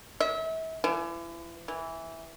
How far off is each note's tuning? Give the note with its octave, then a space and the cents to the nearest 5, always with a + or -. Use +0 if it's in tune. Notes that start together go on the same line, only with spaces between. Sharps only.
E5 -35
E3 +35
E3 -5